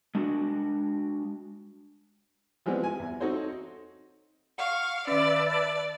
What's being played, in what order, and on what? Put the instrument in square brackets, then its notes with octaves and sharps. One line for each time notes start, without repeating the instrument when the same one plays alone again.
[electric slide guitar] G#3 D4 F#4
[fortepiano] E3 F3 G3 G#3 B3 C4
G#5
E2
C4 D#4 F#4 A4 C5 C#5
[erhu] F5 [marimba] F#5 [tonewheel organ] C#6
[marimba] D#3 C#4 [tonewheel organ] B4 E5 A5 [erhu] D5
[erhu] D5